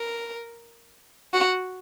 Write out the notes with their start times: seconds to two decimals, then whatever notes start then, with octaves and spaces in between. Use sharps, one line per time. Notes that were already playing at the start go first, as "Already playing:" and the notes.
Already playing: A#4
1.34 F#4